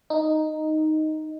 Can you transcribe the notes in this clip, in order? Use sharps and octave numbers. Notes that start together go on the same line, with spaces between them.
D#4